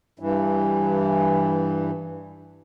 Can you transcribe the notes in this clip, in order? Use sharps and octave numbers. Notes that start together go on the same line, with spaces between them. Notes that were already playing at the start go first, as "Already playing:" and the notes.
G2 E3